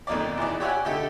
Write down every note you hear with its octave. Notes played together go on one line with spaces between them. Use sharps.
B1 F2 D#3 A#3 D#4 D5
E2 E3 D#4 D5
G4 C#5 D5 E5 F#5 G#5
D3 A3 D#4 G4 A4